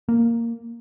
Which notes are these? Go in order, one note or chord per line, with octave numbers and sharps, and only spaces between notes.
A#3